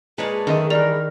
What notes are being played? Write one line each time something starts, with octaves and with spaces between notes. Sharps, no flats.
A#2 G#3 G#4 B4 C#5 D5 A5
F#2 D#3 A3 D#5
E3 G3 A#4 D5 F7